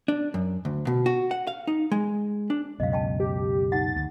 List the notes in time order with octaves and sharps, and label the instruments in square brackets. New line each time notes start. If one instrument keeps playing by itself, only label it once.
[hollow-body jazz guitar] D4
F#2
D2
B2
F#4
F#5
F5
D#4
G#3
D4
[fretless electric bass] C#2 F#2 B2 [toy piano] D#5 F5
[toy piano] D#5 G5 A5
[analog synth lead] G4
[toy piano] D#4 F#5 [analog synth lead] A6
[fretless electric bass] D2